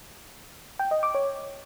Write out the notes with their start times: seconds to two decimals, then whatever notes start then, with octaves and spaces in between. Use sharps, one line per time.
0.79 G5
0.91 D#5
1.03 D6
1.15 C#5